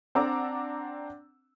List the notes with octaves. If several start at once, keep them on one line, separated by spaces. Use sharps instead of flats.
C4 D4 F#5 A#5 D6 E6